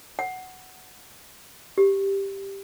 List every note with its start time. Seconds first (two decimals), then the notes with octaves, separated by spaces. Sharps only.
0.19 F#5
1.78 G4